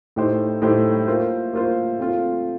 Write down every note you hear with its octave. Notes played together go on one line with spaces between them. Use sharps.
A2 A3 D#4 G4 C5
A2 A3 D#4 G4 C5
A#3 F4 C5
A#3 F4 C5
A3 C4 F4